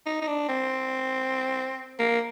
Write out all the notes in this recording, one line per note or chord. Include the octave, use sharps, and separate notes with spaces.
D#4
D#4
D4
C4
A#3